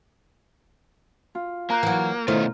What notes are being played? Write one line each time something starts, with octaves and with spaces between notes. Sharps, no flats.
F4
A#3 A#5 F#6 G6
E3 F#3
B2 D#3 A3 C#4 E4 F4 C5